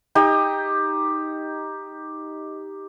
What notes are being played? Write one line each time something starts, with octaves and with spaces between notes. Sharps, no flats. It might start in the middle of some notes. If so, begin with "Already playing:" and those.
D#4 G4 D#5